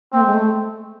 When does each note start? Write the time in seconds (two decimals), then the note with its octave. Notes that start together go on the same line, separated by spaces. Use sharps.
0.12 A#3 C4
0.21 A3
0.27 G#3
0.34 A3